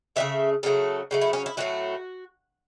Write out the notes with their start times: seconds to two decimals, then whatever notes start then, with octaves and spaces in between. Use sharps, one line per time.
0.16 C#3 F#3 A3 E5
0.63 C#3 F#3 A3 A4
1.11 C#3 F#3 A3
1.21 E4
1.33 C#4
1.46 E4
1.57 A2 F#3 A3 F#4